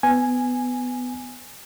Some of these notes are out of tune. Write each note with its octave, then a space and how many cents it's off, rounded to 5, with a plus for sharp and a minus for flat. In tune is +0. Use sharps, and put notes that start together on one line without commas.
B3 +15 G#5 +0